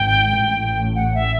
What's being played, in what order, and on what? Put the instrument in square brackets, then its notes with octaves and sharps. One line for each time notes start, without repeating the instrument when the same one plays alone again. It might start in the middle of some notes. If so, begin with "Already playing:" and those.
Already playing: [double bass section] G#1 G#2 [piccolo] G5
[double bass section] A1 A2
[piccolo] F#5
E5